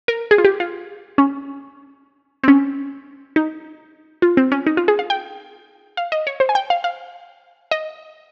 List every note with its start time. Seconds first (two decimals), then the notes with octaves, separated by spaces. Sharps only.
0.08 A#4
0.31 G#4
0.38 F4
0.45 G4
0.60 F4
1.18 C#4
2.43 C4
2.48 C#4
3.36 D#4
4.22 F4
4.37 C4
4.52 C#4
4.67 D#4
4.77 F4
4.88 G#4
4.99 F5
5.10 G5
5.97 F5
6.12 D#5
6.27 C#5
6.40 C5
6.49 G#5
6.55 G5
6.70 F5
6.84 F5
7.71 D#5